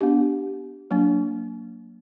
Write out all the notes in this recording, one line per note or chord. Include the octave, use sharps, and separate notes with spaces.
B3 D4 G4
F#3 A#3 D4